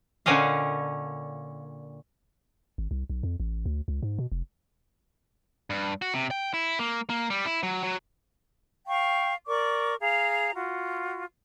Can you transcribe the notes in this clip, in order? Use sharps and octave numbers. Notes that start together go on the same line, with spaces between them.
A#2 D3 C#4 D#5 F5
G#1
C2
B1
F2
A1
D2
C#2
G#2
B2
F1
G2
F#4
C3
G5
E4
A#3
A#3
G3
E4
F#3
F#3
F5 G5 C#6
A#4 D5 C#6 D6
G#4 F5 A#5
F4 F#4